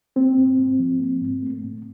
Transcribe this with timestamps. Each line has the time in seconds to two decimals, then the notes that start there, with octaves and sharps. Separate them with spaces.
0.16 A#3 C4
0.37 G#2
0.58 G#2
0.79 F3
1.00 A#3
1.22 G#2
1.43 A3
1.64 A2